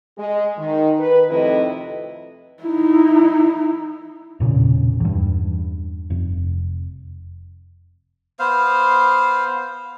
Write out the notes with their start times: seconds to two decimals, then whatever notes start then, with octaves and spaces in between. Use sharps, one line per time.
0.18 G#3
0.58 D#3
0.99 B4
1.30 F2 C3 D#3 A3 E4 D#5
2.63 D#4 E4
4.40 E1 A#2 C#3
5.00 E2 G2
6.10 F1
8.39 B3 C5 F5